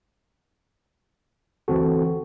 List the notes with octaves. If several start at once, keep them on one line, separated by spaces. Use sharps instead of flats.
D2 E3 C4 F#4 A4